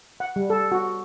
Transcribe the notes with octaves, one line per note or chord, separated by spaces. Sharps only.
F#5
G3
A4
F#4